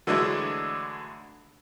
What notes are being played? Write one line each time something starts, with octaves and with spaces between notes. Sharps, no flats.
D3 E3 F#3 G#3 A3 D4